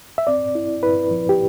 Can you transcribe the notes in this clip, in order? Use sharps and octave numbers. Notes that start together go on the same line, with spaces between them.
E5
C4 D5
E4
E4 B4
F3
G4